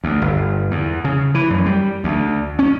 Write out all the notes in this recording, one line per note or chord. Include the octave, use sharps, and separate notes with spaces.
D2
G1
E2
C#3
E3
F#2
G3
D2
C#4